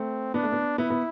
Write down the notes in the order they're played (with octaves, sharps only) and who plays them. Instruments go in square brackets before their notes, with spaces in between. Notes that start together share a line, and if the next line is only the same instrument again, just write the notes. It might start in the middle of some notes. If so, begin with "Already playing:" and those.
Already playing: [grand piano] A3 [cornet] C4
[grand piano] B3 [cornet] D4
[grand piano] A3
B3
[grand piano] B3 [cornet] E4
[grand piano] B3